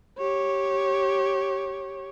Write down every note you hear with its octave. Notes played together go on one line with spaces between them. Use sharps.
G4 C#5